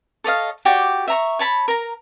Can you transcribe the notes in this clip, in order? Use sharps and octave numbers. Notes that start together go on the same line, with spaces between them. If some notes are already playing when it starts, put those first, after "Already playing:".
A4 C#5 D#5 F5
F#4 G4 D5 G5
E5 A#5 C#6
C#5 A5 B5
A#4 A#5